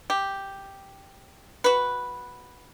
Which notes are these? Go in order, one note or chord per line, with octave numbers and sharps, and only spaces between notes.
G4
F#4 B4